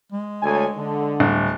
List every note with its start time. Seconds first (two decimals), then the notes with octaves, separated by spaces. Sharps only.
0.12 G#3
0.42 D2 C#5 G#5
0.76 D3
1.20 D1 G3